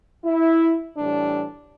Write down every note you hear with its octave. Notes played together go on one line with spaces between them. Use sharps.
E4
A2 E3 G3 D4